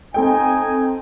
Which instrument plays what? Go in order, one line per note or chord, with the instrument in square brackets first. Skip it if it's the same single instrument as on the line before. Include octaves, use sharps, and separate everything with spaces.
[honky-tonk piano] C4 A4 G5 [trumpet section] D#4 G#5